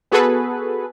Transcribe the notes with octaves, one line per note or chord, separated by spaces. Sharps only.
B3 F#4 G#4 A4 B4